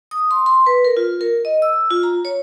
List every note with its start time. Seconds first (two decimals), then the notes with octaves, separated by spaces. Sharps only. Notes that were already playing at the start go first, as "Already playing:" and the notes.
0.11 D#6
0.31 C6
0.46 C6
0.66 B4
0.85 A#4
0.97 F4
1.21 A#4
1.45 D#5
1.62 E6
1.91 F4
2.03 A#5
2.25 C#5